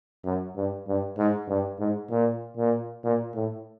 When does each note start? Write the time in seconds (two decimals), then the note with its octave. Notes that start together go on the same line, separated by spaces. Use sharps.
0.25 F#2
0.56 G2
0.87 G2
1.18 G#2
1.49 G2
1.79 G#2
2.11 A#2
2.57 A#2
3.04 A#2
3.35 A2